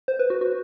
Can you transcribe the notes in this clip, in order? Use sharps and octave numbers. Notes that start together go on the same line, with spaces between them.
C5
B4
F#4
F#4